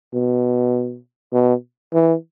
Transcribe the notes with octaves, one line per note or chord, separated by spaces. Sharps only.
B2
B2
E3